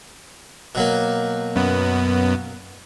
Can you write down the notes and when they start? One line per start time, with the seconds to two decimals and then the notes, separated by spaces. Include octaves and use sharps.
0.75 B2 F#3 A#3
1.56 F#2 B3